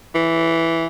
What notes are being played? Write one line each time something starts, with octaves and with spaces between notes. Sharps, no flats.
E3